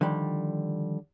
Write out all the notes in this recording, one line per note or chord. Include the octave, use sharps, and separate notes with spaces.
D3 D#3 F3 G3